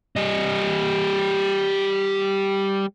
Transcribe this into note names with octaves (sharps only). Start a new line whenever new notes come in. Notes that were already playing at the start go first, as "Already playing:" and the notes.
G3 D#5